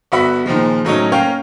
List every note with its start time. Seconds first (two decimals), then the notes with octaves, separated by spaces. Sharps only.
0.12 G1 B3 F#4 E5 F#5 B5
0.46 A#2 D#3 F3 G#3
0.85 A2 F#3 C#4 D#4
1.12 A#3 C#4 C#5 F5 G5